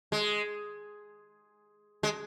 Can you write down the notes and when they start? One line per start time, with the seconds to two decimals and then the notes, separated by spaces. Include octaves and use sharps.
0.12 G#3
2.03 G#3